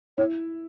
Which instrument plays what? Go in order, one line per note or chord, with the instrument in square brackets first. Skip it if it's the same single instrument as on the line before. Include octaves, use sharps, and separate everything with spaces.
[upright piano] E4 [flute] C#5